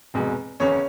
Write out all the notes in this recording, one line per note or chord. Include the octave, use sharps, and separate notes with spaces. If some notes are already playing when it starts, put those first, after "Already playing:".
F1 E2 B2 G#3
F#1 E2 C#3 C#4 C#5